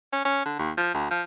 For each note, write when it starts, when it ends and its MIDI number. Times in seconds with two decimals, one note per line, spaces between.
0.13 0.23 61
0.25 0.44 61
0.46 0.56 50
0.59 0.72 39
0.78 0.94 53
0.94 1.08 38
1.11 1.22 53